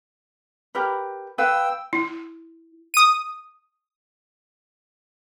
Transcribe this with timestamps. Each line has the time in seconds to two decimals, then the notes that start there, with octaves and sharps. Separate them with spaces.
0.75 G4 A#4 B4
1.38 B4 F5 G5 E6
1.93 E4
2.94 D#6 D#7